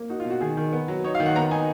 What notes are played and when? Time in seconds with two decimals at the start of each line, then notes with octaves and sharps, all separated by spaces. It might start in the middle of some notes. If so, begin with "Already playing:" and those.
Already playing: A#3
0.09 D#4 F#4
0.20 F4
0.25 B2
0.30 F#4
0.40 D#3 G#4
0.57 D#3
0.73 B3
0.88 F#3
1.04 D#4 C#5
1.15 F5
1.20 D#3
1.26 F#5
1.35 B3 A#5
1.51 D#4 G#5